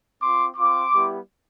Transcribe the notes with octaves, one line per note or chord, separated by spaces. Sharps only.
C4 F4 C6 D6
C4 F4 C6 D6
G3 B3 E4 G4